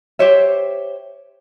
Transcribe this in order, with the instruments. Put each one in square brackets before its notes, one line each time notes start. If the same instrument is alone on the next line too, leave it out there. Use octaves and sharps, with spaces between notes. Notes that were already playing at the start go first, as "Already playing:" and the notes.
[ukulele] G4 C5 C#5 E5